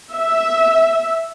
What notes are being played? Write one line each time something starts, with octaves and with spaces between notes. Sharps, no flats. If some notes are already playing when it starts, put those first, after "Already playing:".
E5